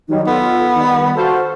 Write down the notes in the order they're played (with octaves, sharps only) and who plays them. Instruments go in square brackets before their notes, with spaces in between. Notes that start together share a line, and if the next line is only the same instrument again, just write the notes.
[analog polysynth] D#3 F#3 G3 [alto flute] D#4
[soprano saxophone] B3 [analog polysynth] F4 [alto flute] A4
[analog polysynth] D#3 G3 [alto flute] B5
[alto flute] F#4 [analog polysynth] A4 C5 F5